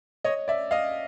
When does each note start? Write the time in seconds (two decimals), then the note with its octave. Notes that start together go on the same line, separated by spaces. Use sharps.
0.24 C#5 D#5
0.48 D5 E5
0.71 D#5 F5